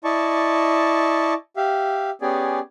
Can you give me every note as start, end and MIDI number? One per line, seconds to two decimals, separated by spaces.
0.04 1.34 64
0.04 1.34 74
0.04 1.34 75
0.04 1.34 81
0.04 1.34 85
1.57 2.10 67
1.57 2.10 76
1.57 2.10 77
2.22 2.59 59
2.22 2.59 61
2.22 2.59 67
2.22 2.59 68
2.22 2.59 74
2.22 2.59 80